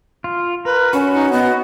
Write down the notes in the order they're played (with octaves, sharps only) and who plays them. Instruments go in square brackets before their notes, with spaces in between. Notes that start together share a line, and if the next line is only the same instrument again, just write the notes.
[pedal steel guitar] F4
[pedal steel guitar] A#4 [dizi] B4
[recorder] C#4 [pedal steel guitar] F#4
[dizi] D#4
[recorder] B3 [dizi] D#5